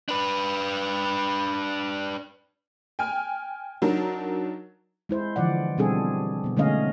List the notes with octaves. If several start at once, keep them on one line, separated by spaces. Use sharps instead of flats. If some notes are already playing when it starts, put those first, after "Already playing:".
D4 B4
G5 G#5 F6
F#3 D4 D#4 A#4
G#3 E4 C5
D3 E3 F3 D5 F#5
B2 G3 C4 D4 G#4 A4
B2 B3
D3 G#3 A3 C#4 D#5 F5